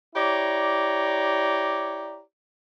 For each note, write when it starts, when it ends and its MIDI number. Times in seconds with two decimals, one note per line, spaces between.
0.15 2.22 64
0.15 2.22 67
0.15 2.22 73
0.15 2.22 74
0.15 2.22 82